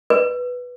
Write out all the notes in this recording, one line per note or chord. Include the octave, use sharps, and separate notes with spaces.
B4